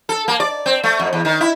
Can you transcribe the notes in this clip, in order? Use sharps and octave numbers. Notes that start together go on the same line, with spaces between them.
A4
A#3
D5
C4
A3
F2
E2
D#3
E4